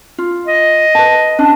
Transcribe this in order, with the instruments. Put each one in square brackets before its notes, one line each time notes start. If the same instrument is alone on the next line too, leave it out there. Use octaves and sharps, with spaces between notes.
[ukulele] F4
[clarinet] D#5
[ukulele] B4 A5
C#4 D4